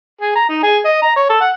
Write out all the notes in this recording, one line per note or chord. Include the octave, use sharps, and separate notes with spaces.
G#4
A#5
D#4
G#4
D#5
A#5
C#5
A4
F#5